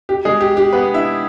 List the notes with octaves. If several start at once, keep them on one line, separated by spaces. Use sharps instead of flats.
G4
G#3 G#4
G4
G4
B3 B4
E4 E5